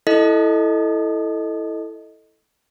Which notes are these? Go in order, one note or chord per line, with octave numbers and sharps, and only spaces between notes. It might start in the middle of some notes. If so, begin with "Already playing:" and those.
E4 A4 D#5